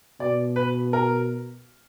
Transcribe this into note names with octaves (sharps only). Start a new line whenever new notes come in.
B2 D5
B4
A#4